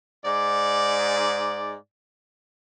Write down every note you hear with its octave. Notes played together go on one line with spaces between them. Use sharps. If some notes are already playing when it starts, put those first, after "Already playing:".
G#2 D5